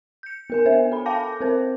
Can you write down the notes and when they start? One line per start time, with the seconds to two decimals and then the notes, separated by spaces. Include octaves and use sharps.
0.23 G6 C#7
0.50 B3 A#4 G#5
0.65 B3 D4 C5 E5
0.92 A4 B5
1.06 F5 G5 A5 D6 G6 A#6
1.41 C4 A#4 C5